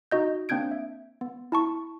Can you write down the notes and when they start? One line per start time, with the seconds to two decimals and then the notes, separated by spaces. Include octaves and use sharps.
0.11 D#4 F#4 D#5 G6
0.49 A#3 C4 D4 G6 G#6 D7
0.71 E5
1.21 B3
1.52 E4 A5 C#6